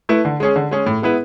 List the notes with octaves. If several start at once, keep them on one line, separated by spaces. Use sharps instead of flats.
A3 E4 B4
D3
G#3 C#4 G#4
D3
G#3 C#4 G#4
A2
G#3 B3 E4 B4